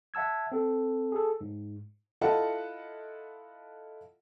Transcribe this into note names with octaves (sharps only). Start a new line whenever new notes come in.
E5 F#5 A5 E6 G#6
C4 A4
G#4 A4
G#2
E4 F4 A4 D#5 F#5 A5